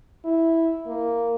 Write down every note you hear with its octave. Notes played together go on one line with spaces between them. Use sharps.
E4
A#3